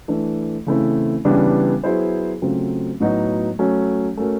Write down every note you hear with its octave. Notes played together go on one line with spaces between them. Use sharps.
E3 A3 D4
C#3 E3 A3 C4 E4
C#3 E3 G3 B3 D4
F#3 B3 E4 G#4 C5
C#3 F#3 A3 C4 F4
A2 F#3 B3 D#4 F#4
F#3 A3 C#4
A3 C#4 F#4 A#4